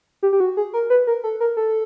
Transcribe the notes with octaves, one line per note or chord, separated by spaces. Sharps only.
G4
G4
F#4
G#4
A#4
B4
A#4
A4
A#4
A4